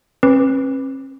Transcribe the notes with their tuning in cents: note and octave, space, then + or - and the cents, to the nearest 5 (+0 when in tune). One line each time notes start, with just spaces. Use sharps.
C#4 -45 B4 +0 D6 +0